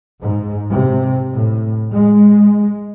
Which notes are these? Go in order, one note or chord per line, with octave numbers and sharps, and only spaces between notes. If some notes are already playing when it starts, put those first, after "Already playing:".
G#2
C3
A2
G#3